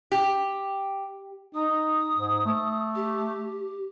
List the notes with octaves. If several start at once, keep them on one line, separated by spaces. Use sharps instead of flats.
G4
D#4 D#6
G#2
A3
G4